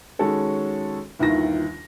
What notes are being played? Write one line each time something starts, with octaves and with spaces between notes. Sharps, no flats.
D#3 G#3 C#4 F#4 A4 C#5
G1 D#2 D#3 E4 F4 A#6